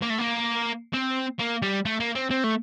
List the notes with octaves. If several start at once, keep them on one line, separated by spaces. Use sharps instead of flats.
A#3
A3
A#3
C4
A#3
G3
A3
A#3
C4
C4
A3